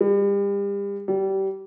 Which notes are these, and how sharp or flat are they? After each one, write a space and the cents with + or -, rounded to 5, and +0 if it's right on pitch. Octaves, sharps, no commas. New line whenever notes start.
G3 +35
G3 -25